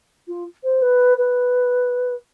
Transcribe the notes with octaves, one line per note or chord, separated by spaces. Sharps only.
F4
C5
B4
B4